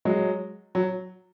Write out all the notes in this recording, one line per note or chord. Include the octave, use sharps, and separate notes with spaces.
F#3 G#3
F#3